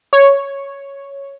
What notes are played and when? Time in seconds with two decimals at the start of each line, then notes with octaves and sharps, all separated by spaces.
0.13 C#5